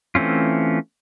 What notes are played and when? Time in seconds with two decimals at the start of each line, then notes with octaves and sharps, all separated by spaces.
0.15 E3 A3 C4 C#4 F4